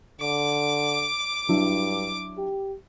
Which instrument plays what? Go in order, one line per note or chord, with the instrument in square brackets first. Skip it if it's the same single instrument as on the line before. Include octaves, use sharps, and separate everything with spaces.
[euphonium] D3 [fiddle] D6
[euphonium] G2 [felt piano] F#3 D4 E4
[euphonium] G4